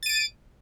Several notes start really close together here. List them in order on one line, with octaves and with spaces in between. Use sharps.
A6 D#7 D7